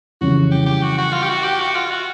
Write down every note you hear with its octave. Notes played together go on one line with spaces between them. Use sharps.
F2 C#3 E3 G3 F#4
G4
G4
F#4
F#4
F4
G4
F#4
G4
F#4
F4
F#4